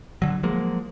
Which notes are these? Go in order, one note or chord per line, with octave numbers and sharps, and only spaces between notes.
D3 F#3
F3 F#3 G#3 A#3